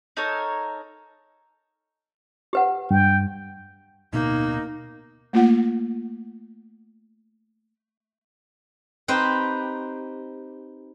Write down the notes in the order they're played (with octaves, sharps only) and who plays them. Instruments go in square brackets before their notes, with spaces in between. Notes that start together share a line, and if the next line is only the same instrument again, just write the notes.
[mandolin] D#4 A4 A#4 C#5
[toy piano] G4 B4 F#5
[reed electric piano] G2 [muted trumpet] G5
[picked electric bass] D1 D2 B2 [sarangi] A#3 [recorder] D#4
[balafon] A3 A#3 F4 F#5
[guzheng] C4 D#4 G4 B4 C5